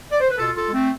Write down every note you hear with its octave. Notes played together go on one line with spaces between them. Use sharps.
D5
C5
B4
B2 F4 A4
F4 A4
G#3
A3 C4